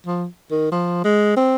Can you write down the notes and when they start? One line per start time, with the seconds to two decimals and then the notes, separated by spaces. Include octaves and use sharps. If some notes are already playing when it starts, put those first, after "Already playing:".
0.07 F3
0.51 D#3
0.72 F3
1.04 G#3
1.37 C4